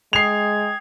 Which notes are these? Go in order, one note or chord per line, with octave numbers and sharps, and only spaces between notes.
G#3 G5 D#6 G#6 C7 F7